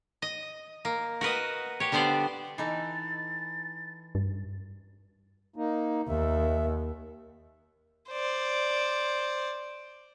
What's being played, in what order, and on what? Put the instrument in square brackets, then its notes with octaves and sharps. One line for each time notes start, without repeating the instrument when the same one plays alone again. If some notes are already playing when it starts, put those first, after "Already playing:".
[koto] D#5
A#3
F#4 A#4 B4 D#5
G4 C#5
D3 G3 B3 C5 D5
[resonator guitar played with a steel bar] E3 D#4 A4 [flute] A6
[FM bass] G2
[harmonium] A#3 D#4
[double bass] D#2 [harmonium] E5
[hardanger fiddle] C5 D5